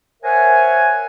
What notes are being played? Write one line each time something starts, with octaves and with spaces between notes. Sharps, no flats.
A#4 C5 C#5 E5 F#5 G#5